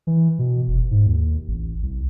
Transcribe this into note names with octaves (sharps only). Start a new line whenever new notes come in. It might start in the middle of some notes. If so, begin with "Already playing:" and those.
E3
B2
F1
G#2
D#2
A1
C2